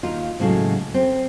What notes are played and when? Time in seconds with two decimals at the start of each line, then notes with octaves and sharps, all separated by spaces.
0.03 D#2 D#4 F4
0.39 D#2 A2 C#3 E3 F#3 G#3
0.94 C4